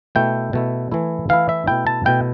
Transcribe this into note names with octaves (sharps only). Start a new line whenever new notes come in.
B2 A3 E4 G5
B2 A3 E4
E3 A3 E4
E3 A3 E4 F5
E5
B2 A3 E4 G5
A5
B2 A3 E4 G5